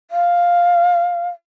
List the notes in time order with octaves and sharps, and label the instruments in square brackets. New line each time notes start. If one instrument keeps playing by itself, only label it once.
[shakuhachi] F5